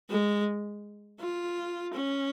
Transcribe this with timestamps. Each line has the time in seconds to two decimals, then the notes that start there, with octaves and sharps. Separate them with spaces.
0.10 G#3
1.20 F4
1.93 C#4